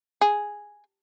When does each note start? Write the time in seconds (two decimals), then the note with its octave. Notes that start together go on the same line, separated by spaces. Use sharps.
0.21 G#4